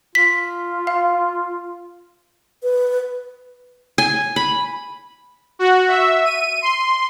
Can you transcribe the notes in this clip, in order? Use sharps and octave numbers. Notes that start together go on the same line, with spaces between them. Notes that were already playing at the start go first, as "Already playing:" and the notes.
F4 B6
F5
B4
G#5
B5
F#4
E5
D#7
C6